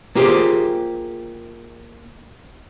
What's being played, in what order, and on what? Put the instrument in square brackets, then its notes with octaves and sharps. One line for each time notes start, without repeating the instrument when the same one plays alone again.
[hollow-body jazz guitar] A#3 F4 G4 G#4 C5